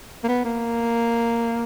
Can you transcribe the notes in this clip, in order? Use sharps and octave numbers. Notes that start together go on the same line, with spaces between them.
A#3
B3
A#3